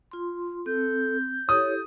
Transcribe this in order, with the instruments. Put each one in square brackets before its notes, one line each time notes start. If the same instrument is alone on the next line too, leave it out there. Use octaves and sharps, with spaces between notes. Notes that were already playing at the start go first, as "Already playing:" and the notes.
[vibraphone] F4 C6
[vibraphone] C4 [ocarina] A4 [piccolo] G6
[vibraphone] E4 G4 A4 [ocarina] C#5 [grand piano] D#6